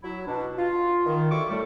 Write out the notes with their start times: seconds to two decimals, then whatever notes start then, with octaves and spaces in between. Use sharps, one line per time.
0.03 F#3 E4
0.28 B2 D4
0.58 F4
1.06 D#3
1.31 D3 E4 F#4 C#6 D6
1.50 A2 G3 A3